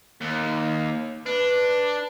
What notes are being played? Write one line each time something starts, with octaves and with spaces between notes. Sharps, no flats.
D#2
D4 B4